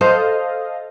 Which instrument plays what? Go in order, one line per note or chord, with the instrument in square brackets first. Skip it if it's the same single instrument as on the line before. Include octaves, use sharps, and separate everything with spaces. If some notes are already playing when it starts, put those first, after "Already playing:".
[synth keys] A4 D#5 F5 [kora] C5